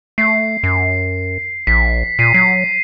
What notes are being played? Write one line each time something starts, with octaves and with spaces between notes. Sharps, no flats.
A3 C7
F#2
A#1 B6
A#2 C7 D#7
F#3 C7